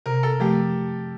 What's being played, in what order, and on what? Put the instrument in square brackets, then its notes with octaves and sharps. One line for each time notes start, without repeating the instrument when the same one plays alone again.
[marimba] C3 [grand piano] A#4
[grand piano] A4
[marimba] F3 A3 [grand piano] G4